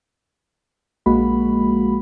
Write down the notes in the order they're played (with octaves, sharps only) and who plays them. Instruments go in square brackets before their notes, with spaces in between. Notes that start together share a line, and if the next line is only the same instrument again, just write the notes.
[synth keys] A#1 G#3 A#3 F#4 B5